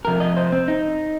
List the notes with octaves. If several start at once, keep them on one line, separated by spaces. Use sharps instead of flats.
F2 C3 A#4
D#5
C5
C4
D#4